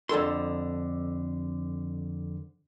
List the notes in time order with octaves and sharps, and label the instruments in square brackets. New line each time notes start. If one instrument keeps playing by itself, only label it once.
[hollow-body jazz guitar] F2 D3 A4 C6